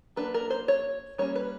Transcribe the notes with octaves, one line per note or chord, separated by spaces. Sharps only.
F#3 A#3 D4 B4
A#4
C5
C#5
G3 A#3 C#4 C#5
B4